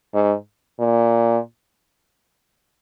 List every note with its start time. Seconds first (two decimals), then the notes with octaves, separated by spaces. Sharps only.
0.14 G#2
0.80 A#2